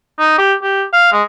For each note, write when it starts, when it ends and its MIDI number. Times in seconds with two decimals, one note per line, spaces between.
0.19 0.34 63
0.38 0.53 67
0.63 0.83 67
0.93 1.07 77
1.12 1.22 56